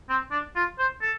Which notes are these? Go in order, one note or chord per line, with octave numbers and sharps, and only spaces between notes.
C4
D4
F4
C5
A4